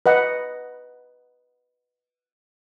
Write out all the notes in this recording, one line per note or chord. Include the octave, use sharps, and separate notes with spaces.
B4 D#5 F#5